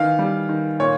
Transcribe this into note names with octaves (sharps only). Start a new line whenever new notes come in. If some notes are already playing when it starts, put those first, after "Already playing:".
Already playing: D#3 E3 F5
G3
D#3
A#2 C#5